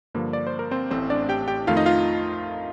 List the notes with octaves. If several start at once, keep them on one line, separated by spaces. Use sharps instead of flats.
G2 D3 F3 A#3
D5
C5
A#4
C4 C5
A1 A2 A3 C4 C5
D4 D5
G4 G5
G4 G5
F2 D#3 A3 F4 F5
D#4 D#5
F4 F5